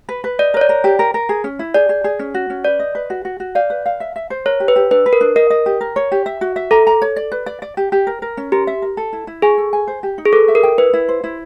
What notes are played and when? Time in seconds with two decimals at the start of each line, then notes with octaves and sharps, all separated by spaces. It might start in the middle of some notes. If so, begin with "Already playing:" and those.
0.09 B4
0.24 B4
0.39 D5 D#5
0.54 A#4 C#5
0.61 D5
0.69 A#4
0.84 G4
0.99 A#4
1.14 A#4
1.29 G#4
1.44 C#4
1.59 E4
1.74 G#4 D5
1.89 G#4
2.04 G#4
2.19 C#4
2.34 F#4
2.50 C#4
2.64 B4 D5
2.79 D#5
2.95 B4
3.10 F#4
3.25 F#4
3.40 F#4
3.55 D5 F5
3.70 B4
3.86 F5
4.00 E5
4.16 E5
4.30 C5
4.46 A#4 C#5
4.60 G4
4.68 B4
4.76 G4
4.91 D4 B4
5.06 B4
5.13 A#4
5.21 D4
5.36 A#4 D#5
5.50 D#5
5.66 G4
5.81 A#4
5.96 C#5
6.12 G4
6.26 E5
6.41 F#4
6.56 E5
6.71 A4 A#5
6.87 A#5
7.02 C#5
7.16 D5
7.32 B4
7.46 D5
7.62 D5
7.77 G4
7.92 G4
8.07 A#4
8.22 A#4
8.37 C#4
8.52 G4 A#4
8.67 E5
8.82 A#4
8.97 A4
9.13 E4
9.27 E4
9.42 G#4 G#5
9.58 A4
9.73 G#5
9.87 C5
10.03 G4
10.18 D#4
10.25 G#4
10.33 A4 B4
10.48 E5
10.55 A#4
10.63 G5
10.78 E4 B4
10.93 E4
11.08 C5
11.24 E4